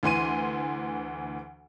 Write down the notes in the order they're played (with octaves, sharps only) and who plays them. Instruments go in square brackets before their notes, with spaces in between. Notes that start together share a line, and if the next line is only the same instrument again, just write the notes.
[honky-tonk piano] D2 E3 C6 D#7